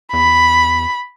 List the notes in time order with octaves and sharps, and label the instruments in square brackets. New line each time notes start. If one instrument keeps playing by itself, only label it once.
[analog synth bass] E2 [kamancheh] B5